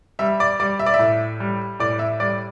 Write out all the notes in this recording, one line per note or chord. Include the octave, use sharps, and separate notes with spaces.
G3 E5
D5
G3 D5
E5
D5
E5
A2
G3
A2 D5
E5
G3 D5